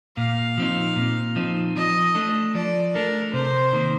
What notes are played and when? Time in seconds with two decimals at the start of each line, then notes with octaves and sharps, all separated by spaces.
0.17 A#2 F5
0.58 F3 C4 D#4
0.96 A#2
1.36 F3 C4 D#4
1.76 F3 D#5
2.15 A3 D4 A4
2.54 F3 D5
2.94 A3 D4 A4 A#4
3.33 C3 C5
3.73 D#3 A#3